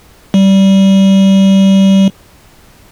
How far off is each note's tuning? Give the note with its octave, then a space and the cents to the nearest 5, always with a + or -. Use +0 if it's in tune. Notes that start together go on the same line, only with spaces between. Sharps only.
G3 -20